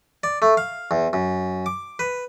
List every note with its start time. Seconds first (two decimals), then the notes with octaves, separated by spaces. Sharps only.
0.23 D5
0.42 A3
0.57 F5
0.91 E2
1.13 F#2
1.66 D6
1.99 B4